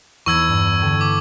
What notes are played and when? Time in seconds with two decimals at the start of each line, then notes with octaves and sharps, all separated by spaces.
0.26 E2 C#6 E6 G#6
0.48 G2
0.81 D3 A4 G5
1.01 D6